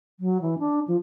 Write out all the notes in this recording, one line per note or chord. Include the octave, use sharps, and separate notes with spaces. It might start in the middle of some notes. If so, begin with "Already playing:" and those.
F#3
E3
D4
F3